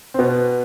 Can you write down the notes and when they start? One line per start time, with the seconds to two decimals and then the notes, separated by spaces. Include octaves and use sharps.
0.14 C4
0.18 B2 B3